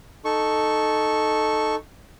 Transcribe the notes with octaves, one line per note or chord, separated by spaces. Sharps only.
D#4 A4 C#6